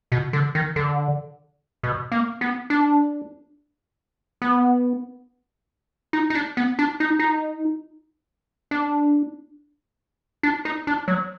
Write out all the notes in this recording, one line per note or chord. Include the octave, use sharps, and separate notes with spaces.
B2
D3
D#3
D3
B2
A#3
B3
D4
B3
D#4
D#4
D4
B3
D4
D#4
D#4
D4
D4
D#4
D4
F#3